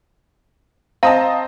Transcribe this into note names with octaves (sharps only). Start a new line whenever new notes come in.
C4 D#5 F5 A5 A#5